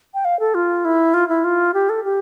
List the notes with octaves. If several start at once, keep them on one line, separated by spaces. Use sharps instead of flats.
G5
F5
A4
F4
E4
F4
E4
F4
G4
A4
G4